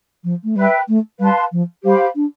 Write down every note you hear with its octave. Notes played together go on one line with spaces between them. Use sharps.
F3
A3
G3 B4 E5 G5
A3
G3 B4 F5 A5 C6
F3
G3 G4 C5 F5 B5
D4